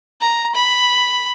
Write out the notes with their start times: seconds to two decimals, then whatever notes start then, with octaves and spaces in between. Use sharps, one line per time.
0.21 A#5
0.55 B5